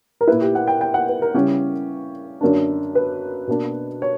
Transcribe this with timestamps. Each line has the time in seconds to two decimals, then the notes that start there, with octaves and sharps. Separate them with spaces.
0.21 A#4
0.27 A#2 A#3 E4 B4
0.41 G4
0.55 F#5
0.67 G5
0.81 G5
0.94 F#5
1.09 B4
1.22 A#4
1.34 C#3 G3 C#4 E4 G4
2.41 F#2 D3 A#3 D4
2.95 B4
3.47 B2 A#3 D4
4.02 C#5